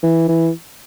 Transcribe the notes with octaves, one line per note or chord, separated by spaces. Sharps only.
E3
E3